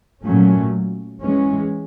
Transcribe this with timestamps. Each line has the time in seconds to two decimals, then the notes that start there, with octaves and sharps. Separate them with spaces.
0.23 A#2 F#3 A3 C#4
1.21 E3 G#3 C#4